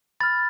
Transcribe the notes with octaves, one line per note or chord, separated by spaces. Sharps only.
B5 F6 A6